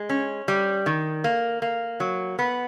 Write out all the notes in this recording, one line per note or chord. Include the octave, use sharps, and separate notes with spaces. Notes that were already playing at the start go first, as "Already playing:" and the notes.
Already playing: G#3
C#4
G3
D#3
A#3
A#3
F#3
B3